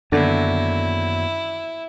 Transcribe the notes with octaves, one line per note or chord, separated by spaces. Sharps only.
F#2 D3 D#3 A#3 B3 E4